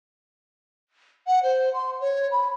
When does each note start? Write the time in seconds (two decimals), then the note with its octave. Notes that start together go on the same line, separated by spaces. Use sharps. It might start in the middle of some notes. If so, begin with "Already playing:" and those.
1.27 F#5
1.43 C5
1.73 C6
2.00 C#5
2.31 B5